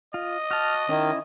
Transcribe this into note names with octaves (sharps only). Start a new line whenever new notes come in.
F4 D#5
F#4 A5 F6
D#3 C#4 E4